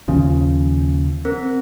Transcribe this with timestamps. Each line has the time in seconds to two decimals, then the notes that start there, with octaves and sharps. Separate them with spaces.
0.08 D#2 C#3 F3
1.25 C4 A#4